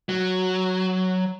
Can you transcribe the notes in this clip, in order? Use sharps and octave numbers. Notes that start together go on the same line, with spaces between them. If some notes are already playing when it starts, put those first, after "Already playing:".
F#3